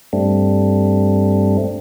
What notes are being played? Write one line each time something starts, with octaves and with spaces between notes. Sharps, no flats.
G2 G3 A3 C4 D4